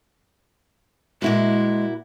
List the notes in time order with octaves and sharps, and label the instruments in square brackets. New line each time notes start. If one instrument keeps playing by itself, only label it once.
[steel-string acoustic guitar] A#2 E4 F#4 [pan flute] G#3